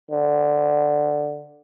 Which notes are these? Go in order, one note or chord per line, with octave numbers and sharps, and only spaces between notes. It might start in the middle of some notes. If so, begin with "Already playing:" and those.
D3